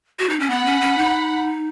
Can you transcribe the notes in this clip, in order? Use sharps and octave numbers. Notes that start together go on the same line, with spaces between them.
F#4
D#4
C#4
B3 F#5 B5
C#4
C#4
D#4